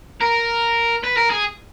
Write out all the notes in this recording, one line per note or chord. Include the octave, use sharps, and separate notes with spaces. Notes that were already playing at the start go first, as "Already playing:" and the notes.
A#4
B4
A#4
G#4